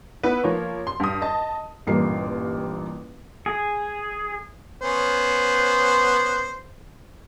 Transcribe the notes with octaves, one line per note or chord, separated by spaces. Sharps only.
B3 E4 B4
F3 A#3 C#5
C6
G2 D#6
D#5 A5
A1 G2 A#2 A#3 C7
G#4
B3 C#4 C5